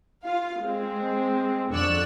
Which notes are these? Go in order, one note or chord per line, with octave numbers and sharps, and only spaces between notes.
F4 F5
G#3 C4
F2 D3 D5 C#6 E6 F#6